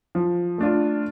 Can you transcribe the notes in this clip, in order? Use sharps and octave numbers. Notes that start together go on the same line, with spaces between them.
F3
A3 D4 F4